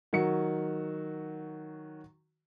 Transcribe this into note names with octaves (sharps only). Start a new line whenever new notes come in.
D#3 F#3 F#4 C#7